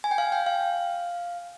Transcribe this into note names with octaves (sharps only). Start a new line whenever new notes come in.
G#5
G5
F5
G5
F5